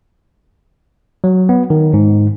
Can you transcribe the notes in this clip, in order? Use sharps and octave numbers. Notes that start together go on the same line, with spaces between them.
F#3
B3
D#3
G#2